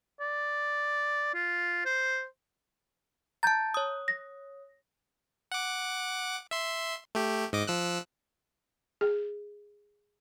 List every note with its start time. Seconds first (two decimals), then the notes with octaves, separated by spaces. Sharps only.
0.20 D5
1.34 F4
1.86 C5
3.43 A5 A#5 G6 A6
3.74 C#5 D#6
4.08 A#6
5.52 F#5 D6
6.51 E5 C6
7.15 A3 G4
7.53 G#2 D#5 D6
7.67 F3 E6 F#6
9.01 G#4